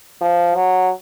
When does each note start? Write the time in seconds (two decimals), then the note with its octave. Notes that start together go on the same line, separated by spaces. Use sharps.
0.21 F3
0.55 F#3